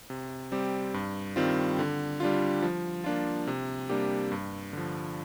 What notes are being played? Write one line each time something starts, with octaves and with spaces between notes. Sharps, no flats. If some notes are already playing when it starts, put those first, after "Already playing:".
C3
G3 C4 G4
G2
D#3 G3 C4 F4
D3
G3 D4 F4
F3
A#3 D4 F4
C3
G3 A#3 D4 G4
G2
D3 F3